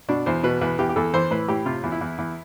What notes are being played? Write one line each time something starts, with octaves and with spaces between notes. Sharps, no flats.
B2 D4
E2 C5
B2 B4
E2 B4
E2 G4
G4
E2 A4
E3 C5
A2 B4
A2 G4
C3 F4
E2
E4
E2
E2